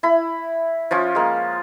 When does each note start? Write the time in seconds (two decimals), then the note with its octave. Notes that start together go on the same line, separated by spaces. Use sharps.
0.03 E4 B5
0.91 F3 C#4 F4
1.15 G#3 A#3